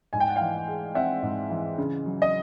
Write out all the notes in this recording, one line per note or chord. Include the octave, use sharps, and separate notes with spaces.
G#2 G#5
G5
F#5
E3 F5 G5
G#3
C4 E5 F#5
G#2
E3
C#3
F#3
D#5